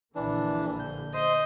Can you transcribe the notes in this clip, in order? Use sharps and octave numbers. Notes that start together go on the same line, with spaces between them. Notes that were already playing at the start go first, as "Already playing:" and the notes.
A#1 D3 E3 A#3 D4
G6
C5 D#5